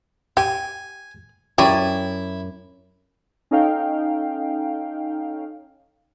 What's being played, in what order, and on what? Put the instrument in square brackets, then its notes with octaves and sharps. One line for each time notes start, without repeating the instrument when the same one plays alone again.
[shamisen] G4 [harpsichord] G#5
[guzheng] F#2 D5 G#5 [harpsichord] E4 [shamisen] G4
[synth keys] C#4 D#4 A4 F5 G5